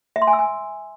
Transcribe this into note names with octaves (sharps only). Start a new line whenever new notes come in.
E5
C6
G#5
E6
G#5